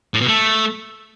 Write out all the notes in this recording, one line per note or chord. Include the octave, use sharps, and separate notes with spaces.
A2
B2
A3